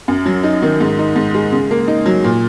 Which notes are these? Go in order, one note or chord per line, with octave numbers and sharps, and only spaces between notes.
F#2
F#3
D#4
D#3
G#2
D#4
G#2
G#3
C#3
A#3
D#4
F#3
A#2